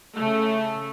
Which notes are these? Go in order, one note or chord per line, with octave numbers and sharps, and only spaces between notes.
C#3 A3